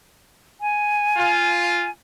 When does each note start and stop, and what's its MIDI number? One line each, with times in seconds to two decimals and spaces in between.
0.61 1.90 80
1.17 1.88 65